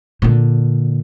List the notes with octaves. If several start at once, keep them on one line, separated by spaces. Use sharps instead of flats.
A#2 D3